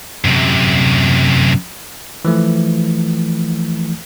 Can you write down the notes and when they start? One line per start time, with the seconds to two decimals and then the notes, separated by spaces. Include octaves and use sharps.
0.24 F#2 C3
2.25 E3 F3 A3